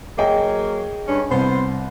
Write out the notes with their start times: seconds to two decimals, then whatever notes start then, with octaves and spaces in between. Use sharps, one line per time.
0.18 F#3 A#3 G#4 C#5 D#5 G5
1.07 G2 C#4 D4
1.31 C2 B3 C5